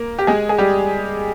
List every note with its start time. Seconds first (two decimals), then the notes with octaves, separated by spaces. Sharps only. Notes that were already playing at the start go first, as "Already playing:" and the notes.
Already playing: A#3 A#4
0.19 G4
0.27 G#3 G#4
0.49 G#4
0.58 G3 G4